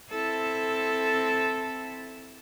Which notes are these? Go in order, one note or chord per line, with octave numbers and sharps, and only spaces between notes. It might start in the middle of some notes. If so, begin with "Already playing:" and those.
C4 E4 A4